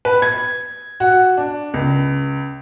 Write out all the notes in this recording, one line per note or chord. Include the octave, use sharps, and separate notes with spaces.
B4
G#6
F#4
D4
C#2